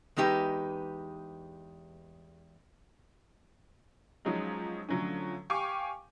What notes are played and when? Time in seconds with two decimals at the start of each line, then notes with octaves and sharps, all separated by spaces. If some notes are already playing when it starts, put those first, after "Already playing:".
0.16 E2 G#3 D#4 G4 B4
4.25 F3 F#3 G#3 C#4 D#4
4.89 D3 F3 F#3 A3 C#4
5.50 G4 F5 G5 G#5 C#6 D6